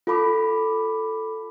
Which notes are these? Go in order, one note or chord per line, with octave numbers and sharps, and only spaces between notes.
F4 A4 B5 D6